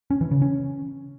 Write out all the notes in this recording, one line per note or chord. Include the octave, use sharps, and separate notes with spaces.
C#4
E3
C#3
C#4